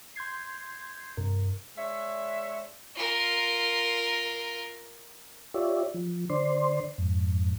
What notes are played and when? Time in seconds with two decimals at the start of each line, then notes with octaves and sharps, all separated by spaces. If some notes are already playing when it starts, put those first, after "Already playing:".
0.16 C6 G6 G#6 C7
1.17 G2 C3 A#4
1.76 G#3 D4 C#5 E5
2.96 F4 A#4
5.54 F4 G4 C#5 D5 E5
5.94 F3
6.30 D3 C5 D5 C6
6.98 F2 G#2